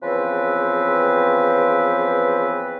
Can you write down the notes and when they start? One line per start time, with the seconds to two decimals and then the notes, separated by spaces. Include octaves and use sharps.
0.02 E2 C#3 F3 C4 B4